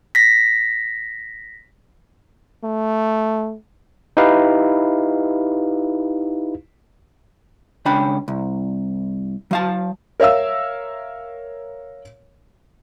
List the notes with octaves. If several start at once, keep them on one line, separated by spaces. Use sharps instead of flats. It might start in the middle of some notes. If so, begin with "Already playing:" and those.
A#6 B6
A3
D#4 E4 G4 B4 F5
C#2 C#4 D4 G5 B5
C2
F#3 F5 A5
A#4 C#5 E5 F5 E6